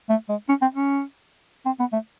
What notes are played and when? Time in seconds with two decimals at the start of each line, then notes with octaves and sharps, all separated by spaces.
0.09 A3
0.29 G#3
0.49 C#4
0.62 C4
0.74 C#4
1.66 C4
1.80 B3
1.92 A3